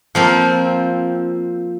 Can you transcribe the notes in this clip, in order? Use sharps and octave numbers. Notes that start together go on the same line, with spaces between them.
F3 A#3 C4